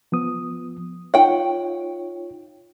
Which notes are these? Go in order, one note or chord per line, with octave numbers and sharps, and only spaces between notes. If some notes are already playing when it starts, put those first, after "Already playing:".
F3 B3 D#6
D#4 F4 C#5 F#5 G5